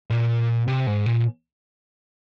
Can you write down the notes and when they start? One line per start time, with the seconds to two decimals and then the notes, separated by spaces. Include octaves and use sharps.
0.10 A#2
0.68 C3
0.87 G#2
1.06 A#2